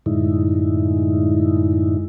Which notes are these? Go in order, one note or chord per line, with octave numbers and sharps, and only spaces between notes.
F#2 A2 D3 G#3 D#4 E4